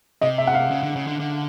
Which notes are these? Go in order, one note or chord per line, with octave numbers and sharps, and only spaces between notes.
C3 D#5
E5
F#5
F5
C#3
D3
C#3
D3
D3